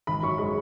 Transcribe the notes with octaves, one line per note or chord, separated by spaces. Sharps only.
G#1 B5
F#2 C#6
G#3 B5